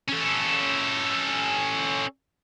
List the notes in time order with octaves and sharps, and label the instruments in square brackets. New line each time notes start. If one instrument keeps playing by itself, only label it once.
[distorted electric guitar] C#4 A4